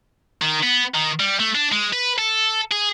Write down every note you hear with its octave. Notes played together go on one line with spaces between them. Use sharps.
D#3
B3
D#3
G3
A3
D4
G#3
B4
A4
G#4